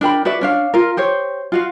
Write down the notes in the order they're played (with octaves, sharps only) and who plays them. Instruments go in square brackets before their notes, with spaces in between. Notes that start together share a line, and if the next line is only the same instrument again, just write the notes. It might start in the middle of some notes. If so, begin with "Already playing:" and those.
[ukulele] D4 A#4 G5 B5
F#4 B4 D5 E5
C#4 D4 F5
F4 A#4
G4 C5 C#5
F4 F#4 F5